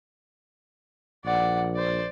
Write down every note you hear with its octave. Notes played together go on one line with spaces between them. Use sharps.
A#1 D5 F#5
C5 D5